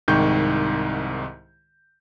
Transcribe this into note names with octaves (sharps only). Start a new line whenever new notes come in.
C2 G#2 D#3 G5 C#6 G6